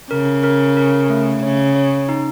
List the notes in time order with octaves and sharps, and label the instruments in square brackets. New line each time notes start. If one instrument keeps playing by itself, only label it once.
[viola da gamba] C#3 [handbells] A#4
[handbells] A#4
A#4
A3
[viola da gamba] C#3 [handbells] C#5
[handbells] C#5
D#4